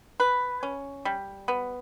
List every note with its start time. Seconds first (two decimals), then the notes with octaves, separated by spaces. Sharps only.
0.20 B4
0.63 C#4
1.05 G3
1.48 B3